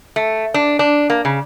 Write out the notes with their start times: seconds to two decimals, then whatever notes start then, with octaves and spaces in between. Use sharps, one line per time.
0.16 A3
0.54 D4
0.79 D4
1.10 A#3
1.25 C#3